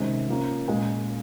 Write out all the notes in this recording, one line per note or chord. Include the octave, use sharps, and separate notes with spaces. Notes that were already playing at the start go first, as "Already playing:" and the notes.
Already playing: C3 D#3 G#3 C#4
F3 A#3 C#4
A#2 G#3 C#4